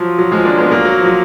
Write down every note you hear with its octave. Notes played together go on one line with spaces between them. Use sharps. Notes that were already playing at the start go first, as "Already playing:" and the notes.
Already playing: F3 F#3
F#3
F3 G#3
A#3 D4
G#3 B3
F#3 A#3
F#3
F3
F#3